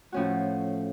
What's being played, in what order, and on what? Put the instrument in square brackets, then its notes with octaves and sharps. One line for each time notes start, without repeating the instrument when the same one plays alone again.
[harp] A2 F3 A3 C#4 F#4